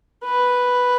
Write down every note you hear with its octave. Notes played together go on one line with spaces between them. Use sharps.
B4